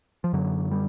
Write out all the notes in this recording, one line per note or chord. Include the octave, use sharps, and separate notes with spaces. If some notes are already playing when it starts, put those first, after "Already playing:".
F3
F#2 D3 F#3
G3